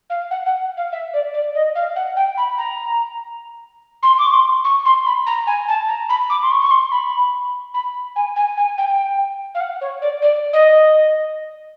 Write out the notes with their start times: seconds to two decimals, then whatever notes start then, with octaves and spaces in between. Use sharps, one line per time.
0.10 F5
0.31 F#5
0.46 F#5
0.77 F5
0.92 E5
1.14 D5
1.34 D5
1.55 D#5
1.75 F5
1.96 F#5
2.16 G5
2.37 B5
2.58 A#5
4.03 C6
4.19 D6
4.26 C#6
4.33 C6
4.64 C#6
4.85 C6
5.06 B5
5.27 A#5
5.47 G#5
5.68 A5
5.89 A#5
6.09 B5
6.30 D6
6.42 C6
6.51 C#6
6.61 C#6
6.71 C6
6.92 B5
7.74 B5
8.16 G#5
8.36 G#5
8.57 G#5
8.78 G5
9.55 F5
9.61 F#5
9.81 C#5
10.02 D5
10.22 D5
10.53 D#5